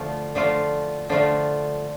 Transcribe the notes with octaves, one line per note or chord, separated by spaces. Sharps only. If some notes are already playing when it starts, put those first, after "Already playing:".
Already playing: D3 F3 A3 F4
D3 F3 A3 F4
D3 F3 A3 F4